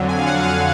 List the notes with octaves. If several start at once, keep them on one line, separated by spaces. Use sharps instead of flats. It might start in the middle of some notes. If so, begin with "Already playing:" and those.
Already playing: F2 D3 F#3
G#5
F5
F#5
F5